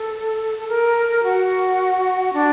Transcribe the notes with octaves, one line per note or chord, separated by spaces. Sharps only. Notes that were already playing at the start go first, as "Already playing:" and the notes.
Already playing: A4
A4
A#4
F#4
D4